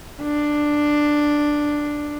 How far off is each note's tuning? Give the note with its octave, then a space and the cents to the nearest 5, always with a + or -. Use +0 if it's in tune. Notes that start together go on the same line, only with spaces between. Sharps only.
D4 +5